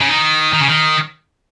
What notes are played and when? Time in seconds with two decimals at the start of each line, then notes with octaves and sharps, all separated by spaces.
0.01 C#3
0.09 D#3
0.54 D#3
0.61 C#3
0.68 D#3